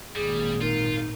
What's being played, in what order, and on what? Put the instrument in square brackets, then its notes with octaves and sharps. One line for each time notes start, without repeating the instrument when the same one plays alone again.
[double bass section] G#1 A#2 [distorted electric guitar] G3 [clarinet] G#4
[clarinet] D#4 [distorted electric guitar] F4 [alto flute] A#4